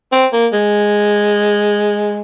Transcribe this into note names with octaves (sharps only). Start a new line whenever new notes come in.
C4
A#3
G#3